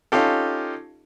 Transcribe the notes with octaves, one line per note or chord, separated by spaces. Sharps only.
C#4 D#4 F4 G4 A4